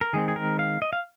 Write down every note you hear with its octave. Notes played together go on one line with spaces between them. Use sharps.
A#4
D#3 G#3 C4 G#4
G#4
A#4
F5
D#5
F5